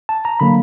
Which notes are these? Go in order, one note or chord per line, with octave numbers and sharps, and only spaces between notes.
A5
A#5
D3 F#3 A#3 B5